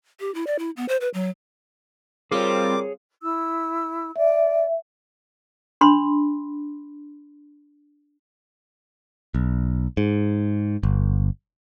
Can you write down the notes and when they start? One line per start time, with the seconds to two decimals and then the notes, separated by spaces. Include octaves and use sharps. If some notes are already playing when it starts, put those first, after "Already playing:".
0.20 G4
0.34 E4
0.47 D5
0.59 E4
0.77 B3
0.89 C5
1.01 B4
1.14 F#3
2.32 G3 C4 F4 G#4 A#4 C#5 D6
3.23 E4 E6
4.16 D5 E5
5.81 D4 B5 C6
9.35 B1
9.97 G#2
10.83 G1